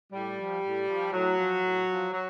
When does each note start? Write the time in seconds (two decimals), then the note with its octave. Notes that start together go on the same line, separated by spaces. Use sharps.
0.13 A2 G3
0.38 F3
0.63 A2
0.88 F3
1.13 A2 F#3
1.38 F3
1.63 A2
1.88 F3
2.13 F#3